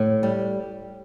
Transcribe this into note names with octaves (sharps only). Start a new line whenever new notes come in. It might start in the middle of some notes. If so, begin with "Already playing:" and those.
Already playing: A2
G3